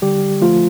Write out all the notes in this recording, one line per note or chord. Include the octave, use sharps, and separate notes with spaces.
D3 G3 G4
F3 A3 F4